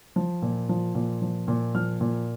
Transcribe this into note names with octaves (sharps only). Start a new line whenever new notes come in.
F3
A#2
F3
A#2
F3
A#2
F3 F6
A#2